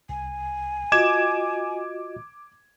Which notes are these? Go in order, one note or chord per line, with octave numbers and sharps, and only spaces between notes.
C2 G#5
F4 F#4 D#5 D6 G#6 E7